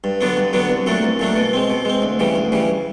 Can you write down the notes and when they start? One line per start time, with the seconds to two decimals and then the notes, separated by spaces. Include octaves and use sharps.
0.04 G2
0.21 D3 F#3 B3 D4
0.37 G2
0.53 D3 F#3 B3 D4
0.70 C2
0.86 A#2 F#3 A3 D4
1.03 C2
1.19 A#2 F#3 A3 D4
1.36 B2
1.53 G#3 C4
1.70 B2
1.85 G#3 C4
2.02 D2
2.19 C#3 E3 G3
2.36 D2
2.52 C#3 E3 G3